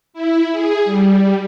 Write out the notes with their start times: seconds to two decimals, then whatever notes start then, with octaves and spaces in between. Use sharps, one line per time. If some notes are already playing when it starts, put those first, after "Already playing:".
0.13 E4
0.52 G#4
0.85 G3